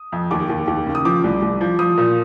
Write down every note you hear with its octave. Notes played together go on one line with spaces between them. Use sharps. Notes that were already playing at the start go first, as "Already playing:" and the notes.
Already playing: D#6
F2
D#2 D6
D#2
D#2
C#3
D#6
F3 D6
C2
C2
F3
F3 D#6
A#2